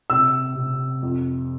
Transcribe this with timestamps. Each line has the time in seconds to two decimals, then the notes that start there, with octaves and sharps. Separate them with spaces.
0.10 C3 E6
0.56 C3
1.03 F2